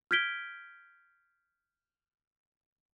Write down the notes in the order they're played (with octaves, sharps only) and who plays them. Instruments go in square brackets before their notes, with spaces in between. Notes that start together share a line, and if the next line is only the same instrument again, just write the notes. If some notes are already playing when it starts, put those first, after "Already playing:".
[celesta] F6 G6 G#6 B6 D7 G7